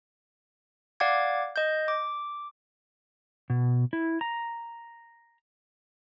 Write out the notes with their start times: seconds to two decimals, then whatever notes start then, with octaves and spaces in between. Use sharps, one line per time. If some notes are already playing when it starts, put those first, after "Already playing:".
1.00 D5 F5 F#5 D6 G#6
1.56 D#5 G6
1.88 D6
3.50 B2
3.93 E4
4.21 A#5